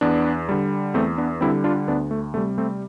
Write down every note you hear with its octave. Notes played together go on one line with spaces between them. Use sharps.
E2 B3 D4
D3 G3
E2 A3 C4
B3 D4
D3 G3 C4 E4
D4 F4
D2 B3 D4
A3
C3 G3 A3
A3 C4